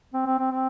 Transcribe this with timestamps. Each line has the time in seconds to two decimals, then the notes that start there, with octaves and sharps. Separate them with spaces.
0.14 C4
0.26 C4
0.38 C4
0.51 C4